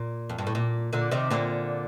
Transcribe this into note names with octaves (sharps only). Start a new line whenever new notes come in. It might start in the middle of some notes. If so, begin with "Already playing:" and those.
Already playing: A#2
F2
G2
A2
A#2
A#2 D3
C3 D#3
A#2 D3